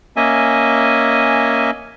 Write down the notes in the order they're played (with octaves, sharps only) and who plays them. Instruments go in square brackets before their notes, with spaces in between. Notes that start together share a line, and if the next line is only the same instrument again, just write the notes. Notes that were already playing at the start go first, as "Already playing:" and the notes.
[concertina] A#3 C#4 D#5 E5 G#5